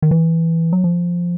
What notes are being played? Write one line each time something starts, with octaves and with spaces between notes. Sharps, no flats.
D#3
E3
F#3
F3